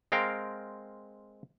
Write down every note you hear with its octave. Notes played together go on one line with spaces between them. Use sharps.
G#3 C4 A#4 F5 G5